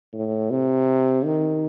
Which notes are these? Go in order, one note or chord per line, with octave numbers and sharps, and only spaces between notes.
A2
C3
D#3